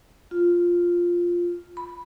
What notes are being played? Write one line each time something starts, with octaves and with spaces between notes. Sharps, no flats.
F4
B5